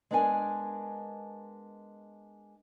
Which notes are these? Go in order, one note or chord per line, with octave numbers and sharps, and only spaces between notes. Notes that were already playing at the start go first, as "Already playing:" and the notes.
G#3 B3 D4 A#4 G5 G#5